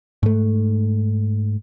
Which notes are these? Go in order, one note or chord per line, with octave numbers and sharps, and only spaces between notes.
G#2 A3